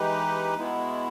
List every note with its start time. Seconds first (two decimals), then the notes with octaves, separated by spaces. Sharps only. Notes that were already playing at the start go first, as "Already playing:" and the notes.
Already playing: E3 G#3 D#4 G4 B4
0.55 B2 G#3 B3 E4